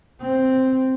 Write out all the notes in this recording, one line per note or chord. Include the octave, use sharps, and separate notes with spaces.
C4